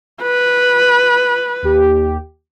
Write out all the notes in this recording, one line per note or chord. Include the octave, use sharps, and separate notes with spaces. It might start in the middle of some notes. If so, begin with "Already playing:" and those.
B4
D#2 G4